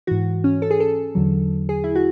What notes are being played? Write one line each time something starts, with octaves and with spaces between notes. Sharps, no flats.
G#2 E3 F#4
C#4
A4
G#4
A4
E2 D3 F#3
G#4
E4
F#4